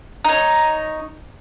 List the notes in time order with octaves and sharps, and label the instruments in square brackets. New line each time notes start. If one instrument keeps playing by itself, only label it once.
[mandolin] D#4 C#5